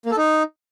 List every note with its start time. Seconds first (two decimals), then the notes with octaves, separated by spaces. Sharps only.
0.06 A#3
0.12 A4
0.17 D#4